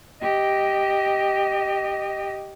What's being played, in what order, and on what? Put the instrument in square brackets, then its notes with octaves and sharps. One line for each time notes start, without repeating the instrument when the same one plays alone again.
[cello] G4 D#5